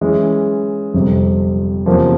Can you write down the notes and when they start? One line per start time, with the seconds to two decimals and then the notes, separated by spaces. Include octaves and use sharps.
0.01 E3 G#3 C#4
0.94 G1 F2 C3
1.86 E2 C3 F3 A#3 C#4